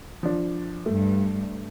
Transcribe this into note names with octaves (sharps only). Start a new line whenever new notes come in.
F3 D4
G2 A3